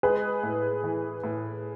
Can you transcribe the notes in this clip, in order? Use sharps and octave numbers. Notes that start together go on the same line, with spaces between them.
G#3 G#4 B4
A2
E3
A2